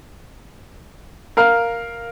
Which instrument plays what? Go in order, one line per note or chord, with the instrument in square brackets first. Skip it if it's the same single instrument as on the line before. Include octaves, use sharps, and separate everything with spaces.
[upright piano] A#4 F5 F6